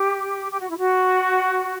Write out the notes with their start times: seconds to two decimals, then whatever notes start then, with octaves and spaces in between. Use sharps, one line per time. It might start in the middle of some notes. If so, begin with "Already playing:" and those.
Already playing: G4
0.51 G4
0.60 F#4
0.68 E4
0.77 F#4